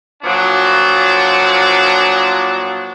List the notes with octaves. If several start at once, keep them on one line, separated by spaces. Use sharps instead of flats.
A#2 F3 F#3 D4